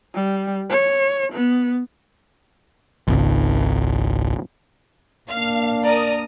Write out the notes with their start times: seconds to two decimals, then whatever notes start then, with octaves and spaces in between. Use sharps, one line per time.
0.15 G3
0.70 C#5
1.32 B3
3.08 G#1 C#2
5.30 A#3 D4 F5
5.83 A#4 D5 A#5 D#6